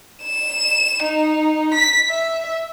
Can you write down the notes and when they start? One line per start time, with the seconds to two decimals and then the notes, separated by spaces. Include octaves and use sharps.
0.23 E7
1.03 D#4
1.74 B6
2.09 E5